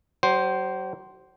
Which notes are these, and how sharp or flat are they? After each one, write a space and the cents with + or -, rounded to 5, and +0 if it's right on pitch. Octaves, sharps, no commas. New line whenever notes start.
F#3 +40 C5 +0